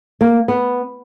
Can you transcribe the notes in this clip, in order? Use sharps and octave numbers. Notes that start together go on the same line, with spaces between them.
A#3
B3